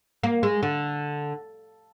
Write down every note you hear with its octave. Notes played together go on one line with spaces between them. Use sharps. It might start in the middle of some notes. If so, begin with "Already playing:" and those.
A#3
G#3
D3